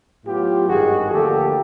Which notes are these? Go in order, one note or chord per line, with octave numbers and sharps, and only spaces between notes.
A2 F#3 B3 F4 G4
G#1 G2 D#3 G#3 F#4 G#4
D2 D3 F3 A#3 G4 A4